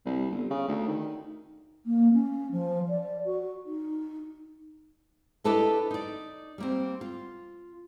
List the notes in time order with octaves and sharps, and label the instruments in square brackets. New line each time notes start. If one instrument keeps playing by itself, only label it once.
[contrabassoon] C2
G1
C#3
D2
D#3
[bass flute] A#3
C#4
F3
D5
F#4
D#4
[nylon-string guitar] D4 E4 G4 A4 B4 D#5
D#4 D5
G3 A#3 C4
F4